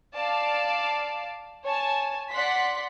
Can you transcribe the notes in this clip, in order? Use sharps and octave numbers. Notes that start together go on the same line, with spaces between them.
D5 F5 A5
C#5 G#5 A5
D5 F#5 C6 B6